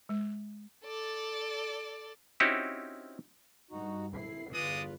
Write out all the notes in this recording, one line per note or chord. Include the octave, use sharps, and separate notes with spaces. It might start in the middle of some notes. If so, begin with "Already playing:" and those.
G#3
A4 D5
C4 C#4 D#4 E4 F#4 G4
G2 D#4 F#4
E4 C7
G1 E2 G#3 F4 B4 D5 D#6